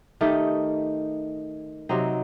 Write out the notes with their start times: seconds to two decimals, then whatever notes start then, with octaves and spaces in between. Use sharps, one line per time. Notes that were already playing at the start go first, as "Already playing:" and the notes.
0.21 D#3 A3 D#4 G4
1.89 C3 F#3 C4 D#4